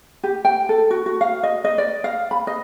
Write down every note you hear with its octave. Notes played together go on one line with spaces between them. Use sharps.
G4
G5
A4
F#4
F#4
F5
D#5
D#5
D5
F5
B5
D#5